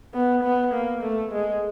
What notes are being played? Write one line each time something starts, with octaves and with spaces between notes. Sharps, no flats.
B3
B3
A#3
A3
G#3